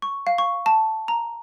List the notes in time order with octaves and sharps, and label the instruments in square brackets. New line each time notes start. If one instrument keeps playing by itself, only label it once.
[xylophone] C#6
F5
C#6
A5
A#5